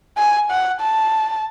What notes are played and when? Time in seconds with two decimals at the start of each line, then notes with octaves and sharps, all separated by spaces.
0.17 G#5
0.51 F#5
0.81 A5